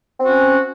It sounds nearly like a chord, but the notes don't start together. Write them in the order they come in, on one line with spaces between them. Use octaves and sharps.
C4 F#4 C#4